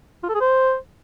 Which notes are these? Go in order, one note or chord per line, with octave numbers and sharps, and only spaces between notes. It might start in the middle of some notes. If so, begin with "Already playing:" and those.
F4
A4
G#4
C5